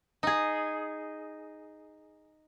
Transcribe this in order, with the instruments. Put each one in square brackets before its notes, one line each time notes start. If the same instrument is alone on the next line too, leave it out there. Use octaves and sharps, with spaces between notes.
[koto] D#4 G#4